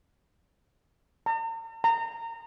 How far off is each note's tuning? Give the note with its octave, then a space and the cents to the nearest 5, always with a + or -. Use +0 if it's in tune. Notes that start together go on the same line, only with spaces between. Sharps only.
A#5 -45
A#5 -25